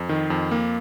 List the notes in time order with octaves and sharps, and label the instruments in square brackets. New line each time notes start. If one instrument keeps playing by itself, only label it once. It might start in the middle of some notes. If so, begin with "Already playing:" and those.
Already playing: [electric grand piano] F2
D#3
F2
A#3